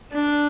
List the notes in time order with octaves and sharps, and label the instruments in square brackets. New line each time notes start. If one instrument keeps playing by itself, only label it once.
[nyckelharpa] D4